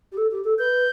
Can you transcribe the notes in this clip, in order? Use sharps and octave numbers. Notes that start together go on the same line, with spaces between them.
G4
A4
G4
A4
B4 G6